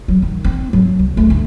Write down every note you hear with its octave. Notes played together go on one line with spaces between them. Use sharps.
F#3
D#3
C4
F#3
C2
A3
D2